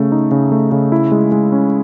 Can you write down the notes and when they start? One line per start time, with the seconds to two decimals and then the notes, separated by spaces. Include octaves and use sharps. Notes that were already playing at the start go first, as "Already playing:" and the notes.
Already playing: C#3 A3
0.12 D#4
0.31 C#3
0.52 A3
0.72 C#3
0.92 E4
1.12 G#3
1.32 G#3
1.52 C#4